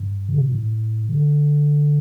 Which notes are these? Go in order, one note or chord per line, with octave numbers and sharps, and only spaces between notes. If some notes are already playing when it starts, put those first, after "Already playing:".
Already playing: G2
D3
C3
A#2
A2
D3